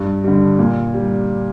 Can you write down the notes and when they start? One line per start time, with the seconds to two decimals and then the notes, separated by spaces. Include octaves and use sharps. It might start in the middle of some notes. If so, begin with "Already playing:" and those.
Already playing: G2
0.24 D3 G3
0.58 A#2
0.93 G3